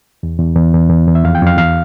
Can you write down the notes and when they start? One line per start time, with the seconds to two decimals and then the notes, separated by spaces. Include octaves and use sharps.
0.23 E2
0.39 E2
0.56 E2
0.73 E2
0.90 E2
1.07 E2
1.15 E5
1.24 F2 F5
1.35 G5
1.42 F2 F5
1.57 E2 F5